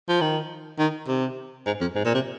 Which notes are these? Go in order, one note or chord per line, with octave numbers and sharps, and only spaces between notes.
F3
D#3
D#3
C3
G#2
F2
G#2
A#2
C3